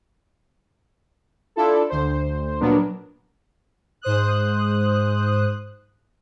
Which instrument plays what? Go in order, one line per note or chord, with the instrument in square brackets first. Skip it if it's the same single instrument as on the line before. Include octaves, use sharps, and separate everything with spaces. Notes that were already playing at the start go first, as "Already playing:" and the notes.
[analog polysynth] D4 E4 F4 A4
D2 C5
A#2 F#3 B3 D4 A#4
G#2 C5 D#6 F#6